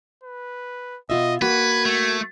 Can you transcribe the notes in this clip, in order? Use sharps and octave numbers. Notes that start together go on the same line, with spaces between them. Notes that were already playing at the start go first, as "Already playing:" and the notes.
B4
B2 F4 D#5 E5
A#3 F#4 B4 G#6
A3